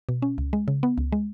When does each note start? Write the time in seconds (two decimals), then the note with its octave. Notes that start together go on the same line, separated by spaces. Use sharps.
0.09 B2
0.22 C#4
0.38 C#2
0.53 G#3
0.68 C#3
0.83 B3
0.98 C#2
1.12 G#3